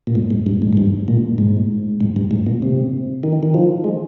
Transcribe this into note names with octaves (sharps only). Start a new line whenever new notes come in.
A#2
G#2
G#2
G2
G#2
G#2
G2
A#2
G#2
G#2
G2
G#2
A#2
C3
D#3
D#3
F3
G#3